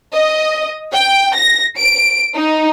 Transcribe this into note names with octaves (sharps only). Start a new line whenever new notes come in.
D#5
G5
A#6
D7
D#4